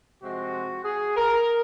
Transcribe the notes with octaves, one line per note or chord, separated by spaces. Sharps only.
C3 F3 G#3 C4 F#4
G#4
A#4